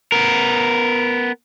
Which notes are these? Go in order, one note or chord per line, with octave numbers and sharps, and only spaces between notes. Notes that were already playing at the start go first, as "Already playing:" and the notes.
B3 A#4